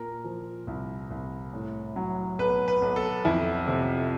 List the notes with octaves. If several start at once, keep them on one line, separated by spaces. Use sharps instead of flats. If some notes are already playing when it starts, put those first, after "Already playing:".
Already playing: A#2 A#4
F3
C2
C2
A2
F#3
B1 B4
B4
B1
A4
F2 E4
C3